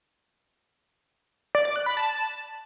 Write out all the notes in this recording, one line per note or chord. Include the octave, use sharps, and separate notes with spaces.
D5
D6
F#6
B5
A5